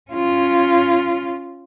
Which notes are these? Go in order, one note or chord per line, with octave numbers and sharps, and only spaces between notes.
C#4 F4